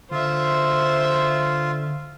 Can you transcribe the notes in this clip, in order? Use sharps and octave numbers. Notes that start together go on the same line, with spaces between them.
D3 F4 C5 E5